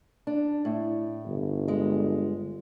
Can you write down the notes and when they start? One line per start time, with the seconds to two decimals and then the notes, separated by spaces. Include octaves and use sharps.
0.27 D4
0.65 A2
1.27 G1
1.68 G#3